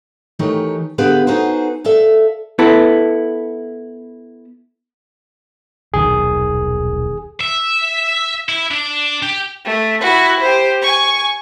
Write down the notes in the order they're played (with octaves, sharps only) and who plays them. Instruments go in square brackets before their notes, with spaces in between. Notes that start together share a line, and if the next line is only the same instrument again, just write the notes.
[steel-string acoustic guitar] D#3 E3 A3 D#4 G4 C#5
D3 B3 G4 G#4 B4 F5
D#4 F#4 G#4 A4 B4 C5
A4 D5 E5 F5
[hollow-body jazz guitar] B3 E4 A4
[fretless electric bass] D#1 B1 D#3 [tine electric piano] G#4
[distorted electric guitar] E5
E4
D4
G4
[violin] A3
E4 F#4
G4 C5
G#5 C#6